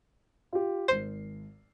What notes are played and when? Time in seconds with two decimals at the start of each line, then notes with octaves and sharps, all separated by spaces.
0.53 F4 G4
0.88 G#1 C5 C7